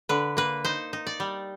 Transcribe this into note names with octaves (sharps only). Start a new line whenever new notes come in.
D3 B4
A#3 B4
D#4 C5
D#4
D5
G3